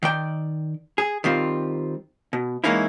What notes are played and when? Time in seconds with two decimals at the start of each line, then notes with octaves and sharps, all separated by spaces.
0.03 D#3 D5 G5
0.98 G#4
1.24 D#3 G3 C4 F4
2.33 B2
2.64 E3 G#3 A#3 C#4 D#4 E4